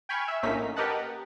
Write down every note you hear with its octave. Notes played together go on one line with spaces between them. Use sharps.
G5 G#5 B5 C#6 F6 G#6
E5
A#1 A2 A#3 C#4 D#4 B6
G4 A#4 B4 D#5 F#5 A5